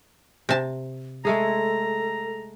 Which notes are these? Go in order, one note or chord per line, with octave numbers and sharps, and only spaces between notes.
C3 A5
G#3 A3 G#4 A4 A#5